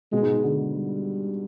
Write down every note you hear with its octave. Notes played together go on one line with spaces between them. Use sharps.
B2 G#3
G#2
G#2
D3
G3